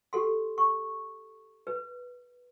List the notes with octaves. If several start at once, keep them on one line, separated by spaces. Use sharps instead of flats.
G4 A4 C6
C#6
B4